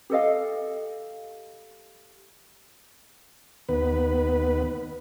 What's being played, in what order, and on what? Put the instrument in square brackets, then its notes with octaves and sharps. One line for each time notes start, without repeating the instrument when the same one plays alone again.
[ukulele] G4 A4 D#5 F5
[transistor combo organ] D#2 B3 B4